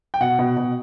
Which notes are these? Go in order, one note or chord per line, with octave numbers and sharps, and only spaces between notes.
G5
B2 F#5
B2
B2